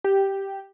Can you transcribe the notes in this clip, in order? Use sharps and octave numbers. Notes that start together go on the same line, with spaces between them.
G4